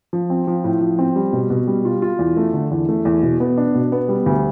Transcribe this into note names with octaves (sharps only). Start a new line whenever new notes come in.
F3
C4
F3
A2
F3
C4
G3
B2
B2
G3
F4
F4
E2
A3
D3
E2
A3
E2
B2
B3
D4
B2
B3
G3
D2